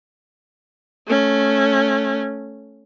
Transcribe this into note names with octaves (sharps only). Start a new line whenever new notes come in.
A3 C#4